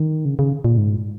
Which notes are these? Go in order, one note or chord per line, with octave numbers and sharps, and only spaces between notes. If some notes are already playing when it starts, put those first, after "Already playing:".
Already playing: D#3
C#3
C#3
A#2
G#2